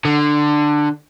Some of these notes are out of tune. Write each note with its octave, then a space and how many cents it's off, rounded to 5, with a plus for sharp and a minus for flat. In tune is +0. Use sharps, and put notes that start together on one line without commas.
D3 +15